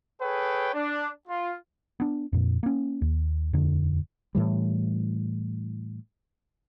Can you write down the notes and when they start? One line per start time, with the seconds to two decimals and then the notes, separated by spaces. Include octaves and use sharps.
0.21 G#4 A4 B4 C#5 G5
0.74 D4
1.28 F4
2.00 B3 D4
2.33 F2 A#2
2.63 A#3 C#4
3.02 D#2
3.53 D#1 F2 D3
4.35 A2 E3 G3